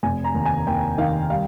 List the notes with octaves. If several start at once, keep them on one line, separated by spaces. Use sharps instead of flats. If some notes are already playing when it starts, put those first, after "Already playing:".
F1 G#5
A#5
D#2
G#5
D#2 G5
D#3 F5
G3 F5